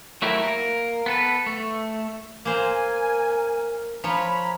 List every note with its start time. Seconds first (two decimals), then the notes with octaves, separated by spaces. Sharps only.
0.22 F#3 A3 E4 G4 A#4
0.44 A#3 A#4
1.06 B3 A4 B4
1.46 A3
2.45 A#3 A#4 C5 G#5 A#5
4.04 F3 C#5 A#5 B5